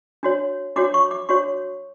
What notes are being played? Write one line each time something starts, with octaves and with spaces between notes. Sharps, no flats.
D4 F#4 C#5
D4 F#4 C#5 D6
C#6
D6
D4 F#4 C#5 C#6